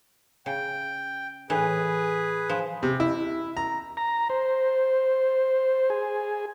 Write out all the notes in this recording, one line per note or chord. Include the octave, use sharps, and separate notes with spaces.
C#3 G5
A2 E3 G#4 B4
F3
C3
E4
A#5
A#5
C5
G#4